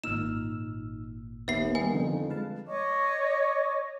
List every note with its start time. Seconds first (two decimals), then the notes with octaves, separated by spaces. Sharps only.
0.04 G#1 A#2 D#4 E6 F6 E7
1.48 D#2 B3 E5 C7
1.75 D#3 G3 B3 G#5
1.93 F2 D3 F3 D#4
2.30 G#3 B4 F5 A5
2.67 C#5 D#5 C#6 D6